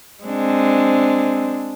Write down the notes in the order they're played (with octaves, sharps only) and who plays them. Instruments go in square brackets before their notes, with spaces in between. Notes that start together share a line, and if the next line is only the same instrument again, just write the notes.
[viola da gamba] G#3 C4 D4